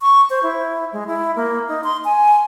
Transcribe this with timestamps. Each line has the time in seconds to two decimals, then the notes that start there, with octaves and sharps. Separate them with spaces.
0.01 C#6
0.30 C5
0.43 E4
0.93 G#3
1.07 E4
1.36 A#3
1.68 D#4
1.84 C6
2.05 G#5